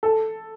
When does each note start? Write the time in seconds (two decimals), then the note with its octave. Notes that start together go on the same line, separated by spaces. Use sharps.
0.03 A4